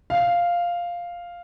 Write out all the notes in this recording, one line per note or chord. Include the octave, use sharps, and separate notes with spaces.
F5